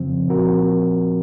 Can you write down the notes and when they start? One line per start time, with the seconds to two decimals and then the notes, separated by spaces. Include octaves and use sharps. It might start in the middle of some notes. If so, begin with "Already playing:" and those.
Already playing: F2 C#3 F3 C4
0.28 A#2 F3 C4 F#4 A#4